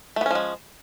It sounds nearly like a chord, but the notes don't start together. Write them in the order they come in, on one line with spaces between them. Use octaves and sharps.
A3 B3 C#4 F3 G#3